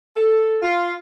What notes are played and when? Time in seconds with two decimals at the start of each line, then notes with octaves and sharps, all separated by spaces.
0.16 A4
0.62 F4